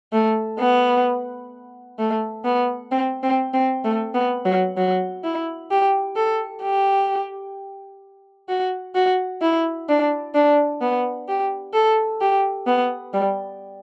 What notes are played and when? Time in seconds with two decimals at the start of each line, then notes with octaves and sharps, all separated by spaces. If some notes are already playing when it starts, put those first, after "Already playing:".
0.13 A3
0.59 B3
1.99 A3
2.45 B3
2.92 C4
3.23 C4
3.54 C4
3.85 A3
4.15 B3
4.46 F#3
4.77 F#3
5.24 E4
5.71 G4
6.16 A4
6.63 G4
8.49 F#4
8.95 F#4
9.42 E4
9.89 D4
10.35 D4
10.81 B3
11.28 G4
11.74 A4
12.21 G4
12.67 B3
13.14 G3